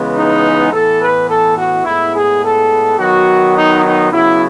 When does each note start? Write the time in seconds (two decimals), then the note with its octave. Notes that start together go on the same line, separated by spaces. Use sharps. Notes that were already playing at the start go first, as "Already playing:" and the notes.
Already playing: C#3 E3 G#3 B3
0.15 D#4
0.72 A2 E3 B3 A4
1.01 B4
1.28 A4
1.57 F#4
1.84 A2 G#3 B3 E4
2.13 G#4
2.42 A4
2.98 D#3 F#3 B3 F#4
3.56 D#4
3.84 D#4
4.11 C#3 F#3 B3 E4